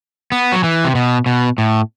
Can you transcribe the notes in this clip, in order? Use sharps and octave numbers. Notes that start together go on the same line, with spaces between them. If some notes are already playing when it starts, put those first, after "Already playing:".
B3
F#3
E3
C3
B2
B2
A2